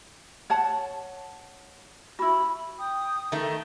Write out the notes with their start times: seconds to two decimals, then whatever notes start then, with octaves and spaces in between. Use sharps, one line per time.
0.50 C#5 F#5 A5
2.19 E4 F#4 B5
2.79 G5 D#6
3.32 D#3 A3 A4